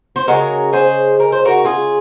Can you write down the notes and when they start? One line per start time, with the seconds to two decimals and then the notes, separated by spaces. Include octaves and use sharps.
0.16 C5
0.28 C#3 G#3 F#4 A#4
0.73 G#4 C5
1.20 A#4
1.32 C5
1.45 F#4 A#4
1.65 F4 G#4